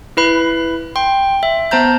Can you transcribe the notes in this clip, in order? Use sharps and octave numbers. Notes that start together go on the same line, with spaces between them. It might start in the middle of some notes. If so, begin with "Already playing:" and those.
E4 B4 B5
G5 C6
E5
B3 C5 A5 A#5 G6